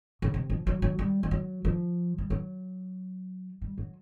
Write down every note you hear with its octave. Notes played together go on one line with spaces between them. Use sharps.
C#3
C3
F3
F#3
F#3
G3
F3
F#3
F3
G3
F#3
G3
F#3